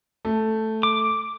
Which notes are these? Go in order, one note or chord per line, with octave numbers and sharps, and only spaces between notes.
A3
D6